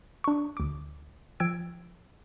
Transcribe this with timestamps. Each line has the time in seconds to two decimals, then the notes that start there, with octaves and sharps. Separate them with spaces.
0.24 D4 C#6
0.57 D2 D6
1.40 F3 G5 E6 G#6 D7